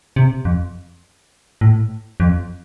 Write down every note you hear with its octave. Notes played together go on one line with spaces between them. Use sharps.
C3
F2
A2
F2